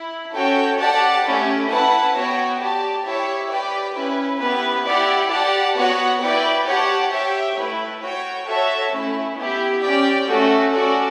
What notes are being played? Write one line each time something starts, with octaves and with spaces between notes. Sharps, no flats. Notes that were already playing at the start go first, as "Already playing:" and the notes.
Already playing: E4
C#4 F#4 A4 C#5 G5
G4 D5 F#5 A5
A3 C#4 E4 G4
E4 B4 F#5 A5
B3 F#4 C#5 G5
G4 D5 A5
E4 G4 C#5 E5
G4 B4 D5 G5
C#4 E4 B4
B3 E4 G4 B4
E4 G4 D5 F#5
G4 D5 F#5 A5
B3 F#4 C#5 F#5
E4 B4 D5 G5
G4 C#5 F#5 A5
G4 C#5 E5 G5
A3 E4 B4
F#4 C#5 G5
F#4 A4 C#5 E5 A5
A3 C#4 E4
B3 E4 G4
C#4 G4 D5 G5
A3 C#4 F#4 A4
C#4 F#4 A4 D5